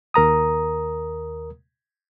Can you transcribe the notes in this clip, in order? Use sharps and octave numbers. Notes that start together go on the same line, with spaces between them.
D#2 A#4 A#5 D#6